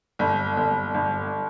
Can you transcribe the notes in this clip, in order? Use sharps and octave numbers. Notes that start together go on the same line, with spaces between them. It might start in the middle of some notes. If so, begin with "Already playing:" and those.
G1
G1
G1